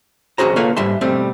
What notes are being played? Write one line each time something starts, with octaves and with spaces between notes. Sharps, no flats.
B1 C#4 F#4 G#4 C5 A#5
A#3 F4 A4 B4 C#5 F5
G#2 G3 E5 A5 C6
B2 G3 A3 C4